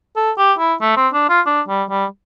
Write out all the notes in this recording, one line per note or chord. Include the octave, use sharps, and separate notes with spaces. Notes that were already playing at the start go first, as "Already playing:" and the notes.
A4
G4
E4
A3
C4
D4
F4
D4
G3
G3